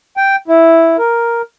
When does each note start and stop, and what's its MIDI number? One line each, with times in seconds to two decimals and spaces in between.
0.17 0.36 79
0.48 0.97 64
0.98 1.42 70